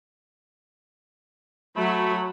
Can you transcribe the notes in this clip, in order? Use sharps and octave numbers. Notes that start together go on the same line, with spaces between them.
F#3 A3 B5